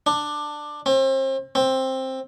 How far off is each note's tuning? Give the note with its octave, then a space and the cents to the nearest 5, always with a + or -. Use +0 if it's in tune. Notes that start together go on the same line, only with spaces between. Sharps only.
D4 +15
C4 +35
C4 +10